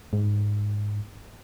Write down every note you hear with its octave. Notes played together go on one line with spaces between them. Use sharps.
G#2